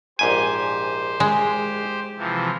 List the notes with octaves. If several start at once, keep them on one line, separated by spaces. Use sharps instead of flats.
A#1 G#2 G4 C5 G#5
G#3
C3 E3 F3